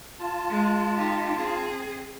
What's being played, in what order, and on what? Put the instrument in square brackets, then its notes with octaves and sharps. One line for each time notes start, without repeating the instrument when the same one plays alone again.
[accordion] F4 A5
[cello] G#3
D#4 G4
C4 G#4